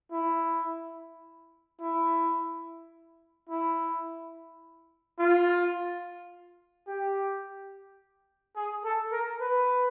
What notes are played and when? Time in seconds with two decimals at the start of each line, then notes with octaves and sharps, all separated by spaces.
0.12 E4
1.81 E4
3.50 E4
5.19 F4
6.87 G4
8.56 G#4
8.84 A4
9.12 A#4
9.41 B4